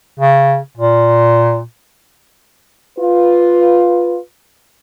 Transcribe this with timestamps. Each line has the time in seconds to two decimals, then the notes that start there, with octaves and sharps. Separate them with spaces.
0.20 C#3
0.78 A#2
2.97 F4 B4